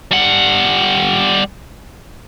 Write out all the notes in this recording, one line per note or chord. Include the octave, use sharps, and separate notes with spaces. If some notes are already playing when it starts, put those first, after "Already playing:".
G3 F#5